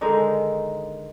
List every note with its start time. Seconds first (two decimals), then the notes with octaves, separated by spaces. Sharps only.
0.01 D3 D#3 G#3 D#4